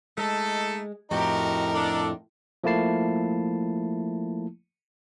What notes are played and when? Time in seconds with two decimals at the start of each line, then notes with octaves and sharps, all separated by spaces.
0.18 G#3 A3 D#4 A4
1.11 F2 A2 D#4 F#4 G4 A#4
1.74 D4 A4
2.64 F3 A3 A#3 E4 A5 C7